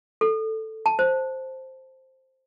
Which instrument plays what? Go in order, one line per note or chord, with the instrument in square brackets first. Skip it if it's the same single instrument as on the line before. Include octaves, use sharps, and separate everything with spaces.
[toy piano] A4
A5
C5